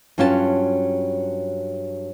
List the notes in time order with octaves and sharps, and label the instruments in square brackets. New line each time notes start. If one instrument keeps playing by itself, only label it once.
[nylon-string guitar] G2 F#3 C#4 F4 F#4 A5